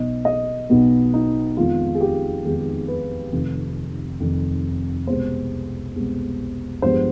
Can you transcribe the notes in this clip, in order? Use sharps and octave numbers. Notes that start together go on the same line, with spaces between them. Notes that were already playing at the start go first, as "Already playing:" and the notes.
Already playing: B1 B2 B3 D#5
D#5
B1 B2 B3
D#4
F2 D#3 G#3 B3 F4
G#4
G4
F2 D#3 G#3 B3 G#4
B4
F1 F2 D#3
F1 F2 D#3
C2 B2 G#3 B3 C5
C2 B2 G#3 B3
G2 F3 G#3 B3 C5